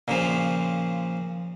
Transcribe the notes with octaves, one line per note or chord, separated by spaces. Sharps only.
A#2 C#3 F3